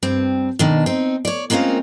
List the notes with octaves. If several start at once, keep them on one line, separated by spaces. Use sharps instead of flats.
G2 C4
B2 D#3 D4
C4 D#4
C#5 D5
G#3 A#3 C4 C#4 F4 A#4